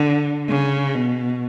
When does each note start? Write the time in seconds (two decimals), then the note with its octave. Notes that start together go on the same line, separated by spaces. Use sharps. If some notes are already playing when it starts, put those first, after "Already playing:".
Already playing: D3
0.49 C#3
0.95 B2